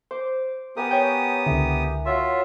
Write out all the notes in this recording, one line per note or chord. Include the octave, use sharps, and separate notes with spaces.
C5 D6
B3 G4 A#4 F#5 G#5 D#6
C#5 G5
C#2 D3 E4
F4 F#4 C#5 E5